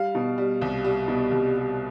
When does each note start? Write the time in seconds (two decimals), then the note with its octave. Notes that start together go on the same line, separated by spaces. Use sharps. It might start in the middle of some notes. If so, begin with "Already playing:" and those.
Already playing: G3 F5
0.15 B2
0.38 G3
0.62 C2
0.85 G3
1.08 B2
1.31 C2
1.56 G3